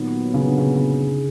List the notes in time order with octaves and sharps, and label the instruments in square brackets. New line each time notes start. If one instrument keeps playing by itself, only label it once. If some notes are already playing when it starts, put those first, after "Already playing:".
Already playing: [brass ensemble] A#2 F#3 B3 [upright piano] D#3
[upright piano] C#3
D3
C#3
C#3